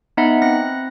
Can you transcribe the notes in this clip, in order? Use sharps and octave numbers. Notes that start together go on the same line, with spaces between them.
B3 D#4 D#5 E5 F#5 B5
C4 F#6 A#6